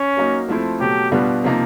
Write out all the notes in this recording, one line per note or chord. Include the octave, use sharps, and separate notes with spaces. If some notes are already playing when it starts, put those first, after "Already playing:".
Already playing: C#4
F#3 A#3 D#4
F3 A3 C4 E4
B2 F#3 A3 G4
B2 G3 B3 D4 F4
C3 F3 A#3 D#4